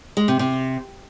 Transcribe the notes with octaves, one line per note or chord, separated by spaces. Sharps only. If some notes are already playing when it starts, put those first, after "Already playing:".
G#3
C3
C3